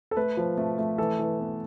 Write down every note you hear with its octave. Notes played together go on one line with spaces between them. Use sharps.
A4
A3 B4
F3
A3
A3
E3 A4
E3
B3